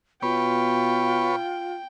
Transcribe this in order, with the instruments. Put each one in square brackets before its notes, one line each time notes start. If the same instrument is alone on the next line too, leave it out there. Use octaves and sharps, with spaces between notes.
[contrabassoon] B2 [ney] F4 [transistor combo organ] B4 C#5 [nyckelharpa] G5